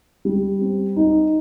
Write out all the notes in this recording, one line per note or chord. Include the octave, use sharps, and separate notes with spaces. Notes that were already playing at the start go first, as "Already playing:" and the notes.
G3
C4
D#4